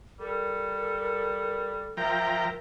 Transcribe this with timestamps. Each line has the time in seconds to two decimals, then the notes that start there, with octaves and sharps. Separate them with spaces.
0.20 G3 A4 A#4
1.97 F3 A#4 E5 G5 A#5 G6